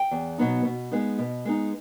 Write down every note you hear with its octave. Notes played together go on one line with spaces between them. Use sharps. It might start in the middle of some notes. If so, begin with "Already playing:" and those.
Already playing: G5
E2
B2 F#3 B3 D#4
B2
G#3 B3 D#4
B2
G#3 B3 D#4